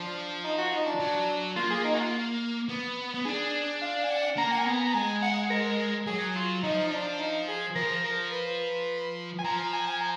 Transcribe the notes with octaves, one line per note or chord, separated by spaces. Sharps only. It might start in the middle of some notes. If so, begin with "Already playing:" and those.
Already playing: F3 D4
D#4
F#4
D#4
D4
F#3
A#3 F4
G#4
D#4
F#4
F4
B3
B3
D4 G#4
F5
G#5
F#5
A#3 A#5
F#5
G#5
B3 A#5
A#5
G#3 G#5
F#5
A#4
F#3 G#4
F4
F3 D#4
D#4
D4
D#4
G#4
F3 A#4
A#4
B4
G#5
F3 A#5
A#5
G#5
G#5
A#5